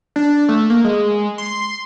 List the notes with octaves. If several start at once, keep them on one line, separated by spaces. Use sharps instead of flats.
D4
A3
A#3
G#3
C6